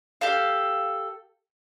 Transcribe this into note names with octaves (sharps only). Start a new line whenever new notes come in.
G4 A4 F5